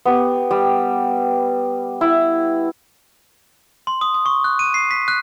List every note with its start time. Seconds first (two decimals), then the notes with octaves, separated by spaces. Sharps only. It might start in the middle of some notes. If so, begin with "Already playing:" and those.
0.05 B3 G4
0.51 G3
2.01 E4
3.87 C6
4.01 D#6
4.14 D#6
4.26 C#6
4.44 F#6
4.59 D#7
4.74 C7
4.91 B6
5.08 F#6